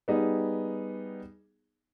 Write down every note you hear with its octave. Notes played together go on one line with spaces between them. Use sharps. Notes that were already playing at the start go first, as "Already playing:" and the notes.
G3 B3 D#4 G#4